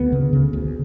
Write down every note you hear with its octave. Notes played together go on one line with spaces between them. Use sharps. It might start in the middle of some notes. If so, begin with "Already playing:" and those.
Already playing: D2 B3
C#3
C#3
D2